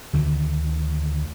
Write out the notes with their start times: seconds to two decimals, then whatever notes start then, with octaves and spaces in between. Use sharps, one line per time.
0.13 D2 D3 D#3